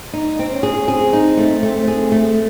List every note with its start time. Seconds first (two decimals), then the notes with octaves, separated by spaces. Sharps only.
0.13 D#4
0.39 C4
0.52 C#4
0.63 G#4
0.88 C4 G#4
1.13 D#4
1.37 A3
1.62 A3 C4
1.88 G#4
2.12 A3